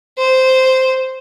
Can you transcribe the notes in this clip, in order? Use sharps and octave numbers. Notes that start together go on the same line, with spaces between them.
C5